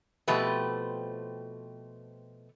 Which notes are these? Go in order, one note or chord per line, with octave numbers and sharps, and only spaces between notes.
B2 F3 A3 C4 G4 B4